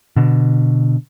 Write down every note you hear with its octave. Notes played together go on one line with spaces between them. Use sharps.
B2 D3